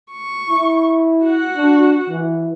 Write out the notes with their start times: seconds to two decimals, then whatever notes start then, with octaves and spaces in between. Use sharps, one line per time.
0.12 C#6
0.50 E4
1.23 F#4 F#5
1.56 D4
2.10 E3